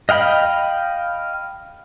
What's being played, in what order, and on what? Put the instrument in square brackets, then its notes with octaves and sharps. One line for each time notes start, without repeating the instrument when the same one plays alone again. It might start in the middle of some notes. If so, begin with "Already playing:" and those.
[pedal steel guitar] D#5 F5 G5 B5